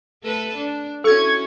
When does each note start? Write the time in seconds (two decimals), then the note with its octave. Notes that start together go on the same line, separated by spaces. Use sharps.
0.23 A3 A4 B4
0.55 D4
1.04 C#4 E4 F#4 A4 C#6 G#6